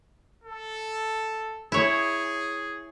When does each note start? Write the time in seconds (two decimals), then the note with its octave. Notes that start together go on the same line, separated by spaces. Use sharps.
0.44 A4
1.72 E4 G#4 C#5